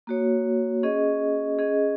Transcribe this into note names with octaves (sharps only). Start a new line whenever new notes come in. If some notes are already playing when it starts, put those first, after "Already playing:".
A#3 F#4 C#5
C#4 G#4 D#5
C#4 G#4 D#5